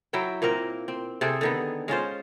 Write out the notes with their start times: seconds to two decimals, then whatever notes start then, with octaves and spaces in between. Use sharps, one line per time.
0.13 F#3 E4 E5 G5
0.42 A#2 A#3 C4 A#4
0.88 C4
1.21 C3 C4 G#4 A4
1.41 D3 D#3 B3
1.88 G#3 C#4 F4 C5